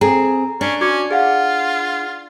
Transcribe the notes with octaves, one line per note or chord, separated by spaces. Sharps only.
C4 G#4 A4 A#5
C#4 D4
C#4 F#4 D6 G#6
F4 G#4 F5 F#5